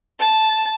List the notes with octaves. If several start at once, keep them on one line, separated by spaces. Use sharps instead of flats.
A5